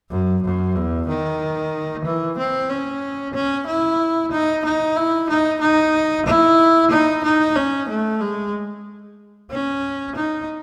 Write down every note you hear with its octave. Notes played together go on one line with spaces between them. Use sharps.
F#2
F#2
E2
D#3
E3
C4
C#4
C#4
E4
D#4
D#4
E4
D#4
D#4
E4
D#4
D#4
C#4
A3
G#3
C#4
D#4